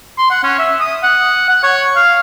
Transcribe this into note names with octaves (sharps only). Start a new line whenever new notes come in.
C6
F#5
C#4
E5
D#6
F#5
F#5
C#5
F5